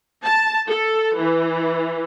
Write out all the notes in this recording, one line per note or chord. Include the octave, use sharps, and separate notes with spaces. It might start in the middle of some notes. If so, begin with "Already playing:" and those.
A5
A4
E3